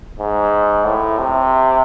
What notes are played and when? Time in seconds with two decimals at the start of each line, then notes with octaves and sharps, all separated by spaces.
0.19 G#2
0.86 A2
1.19 C3